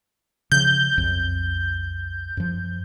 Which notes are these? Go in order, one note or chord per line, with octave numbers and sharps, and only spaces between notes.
C#3 F3 G6
B1 F2
F#2 F3